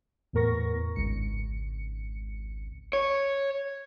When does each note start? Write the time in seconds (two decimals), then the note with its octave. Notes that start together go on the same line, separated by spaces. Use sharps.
0.33 E2 A2 B3 A#4 C#6 A#6
0.96 G#1 C#2 C#7
2.93 C#5